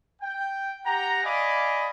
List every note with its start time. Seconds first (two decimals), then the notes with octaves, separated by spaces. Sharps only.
0.21 G5
0.84 G4 F#5 G5 A#5
1.23 D5 D#5 F5 G#5 B5 D6